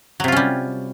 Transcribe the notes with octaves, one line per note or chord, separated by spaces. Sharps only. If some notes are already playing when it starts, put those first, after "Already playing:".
C3 F#3 G3 C#4 F4